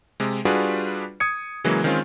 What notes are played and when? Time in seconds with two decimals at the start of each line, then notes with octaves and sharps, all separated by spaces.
0.20 C3 G#3
0.45 G3 D4 F4 F#4 G#4 B4
1.20 D#6 G#6 C#7
1.64 C#3 E3 F#3 G#3 A#3
1.84 D#3 G#3 C4 C#4 F4